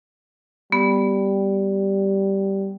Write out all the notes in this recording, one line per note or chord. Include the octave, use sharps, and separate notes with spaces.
G3 B3